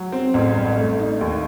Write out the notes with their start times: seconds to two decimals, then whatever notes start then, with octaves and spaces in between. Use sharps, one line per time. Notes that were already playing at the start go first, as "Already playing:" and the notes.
Already playing: F#3
0.12 C4
0.34 A1
0.56 G2
0.77 A3
0.99 D#4
1.21 D#2